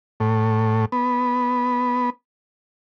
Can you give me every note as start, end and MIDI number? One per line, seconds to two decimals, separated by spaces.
0.20 0.85 45
0.92 2.10 59